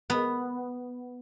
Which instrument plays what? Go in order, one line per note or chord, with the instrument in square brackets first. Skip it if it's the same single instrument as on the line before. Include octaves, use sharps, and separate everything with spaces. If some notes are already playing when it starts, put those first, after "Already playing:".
[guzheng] B3